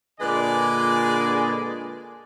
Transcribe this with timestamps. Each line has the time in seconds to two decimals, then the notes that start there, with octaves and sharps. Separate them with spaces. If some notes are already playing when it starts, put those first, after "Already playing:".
0.20 A#2 D3 G#3 B4 D5 G#5